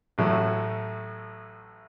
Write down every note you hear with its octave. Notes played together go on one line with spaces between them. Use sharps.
A1 A2 F#3 A3